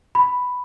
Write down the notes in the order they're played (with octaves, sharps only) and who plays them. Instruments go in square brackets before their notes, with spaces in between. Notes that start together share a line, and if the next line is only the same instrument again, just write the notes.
[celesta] B5